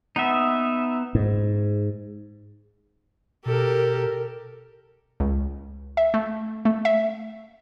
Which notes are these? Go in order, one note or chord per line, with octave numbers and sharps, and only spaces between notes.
B3 D#4 E5
G#2
B2 G4 A4 A#4
C#2
E5
A3
A3
E5